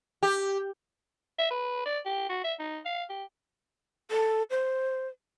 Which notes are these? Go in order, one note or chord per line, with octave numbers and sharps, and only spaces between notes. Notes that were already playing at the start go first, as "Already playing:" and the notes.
G4
E5
B4
D5
G4
F#4
E5
D#4
F5
G4
A4
C5